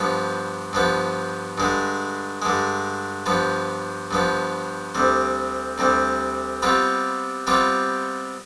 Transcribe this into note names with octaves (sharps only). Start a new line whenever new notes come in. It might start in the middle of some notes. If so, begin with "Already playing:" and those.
Already playing: G2 F3 B3
G2 F3 B3
G2 D3 G#3
G2 D3 G#3
G2 F3 B3
G2 F3 B3
D2 C3 G3
D2 C3 G3
C3 G3 B3 F4
C3 G3 B3 F4